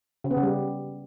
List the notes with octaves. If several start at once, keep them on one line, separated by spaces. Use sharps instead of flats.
C#3
B3
C#3
G3